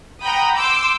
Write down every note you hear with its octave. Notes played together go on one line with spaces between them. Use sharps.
F#5 G5 A#5 B5 D#6 G6
C6 D6 E6 G6 D7